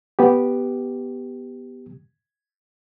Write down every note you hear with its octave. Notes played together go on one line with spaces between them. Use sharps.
B3 G4